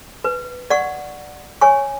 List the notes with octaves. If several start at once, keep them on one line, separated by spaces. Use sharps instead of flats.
B4
D5 F#5 C#6
C#5 G#5 C#6